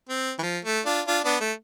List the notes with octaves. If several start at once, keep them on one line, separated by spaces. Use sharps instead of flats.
C4
E3
F3
A3
D4 F4
D4 F4
B3 D4
A3